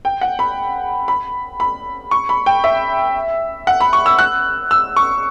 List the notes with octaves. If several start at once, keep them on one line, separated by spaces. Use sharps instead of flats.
G5
F#5
B5
B5
B5
C#6
B5
G5
E5
F#5
B5
C#6
E6
F#6
E6
C#6